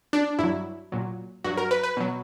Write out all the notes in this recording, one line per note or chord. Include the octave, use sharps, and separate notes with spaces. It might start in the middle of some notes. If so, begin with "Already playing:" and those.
D4
G2 F#3 E4
A#2 F#3
G2 F#3 F#4
A#4
B4
B4
B2 F#3